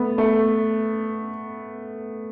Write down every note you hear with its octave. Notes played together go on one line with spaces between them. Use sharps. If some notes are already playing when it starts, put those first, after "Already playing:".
Already playing: A3 B3
A3